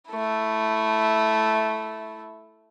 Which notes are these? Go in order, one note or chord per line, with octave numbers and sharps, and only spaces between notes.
A3 E4